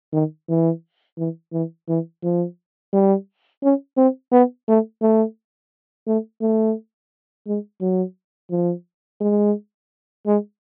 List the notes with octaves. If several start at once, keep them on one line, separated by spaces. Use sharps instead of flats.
D#3
E3
E3
E3
E3
F3
G3
C#4
C4
B3
A3
A3
A3
A3
G#3
F#3
F3
G#3
G#3